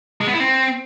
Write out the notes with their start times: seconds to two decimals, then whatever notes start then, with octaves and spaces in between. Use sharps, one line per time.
0.21 G#3
0.27 B3
0.34 E4
0.40 C4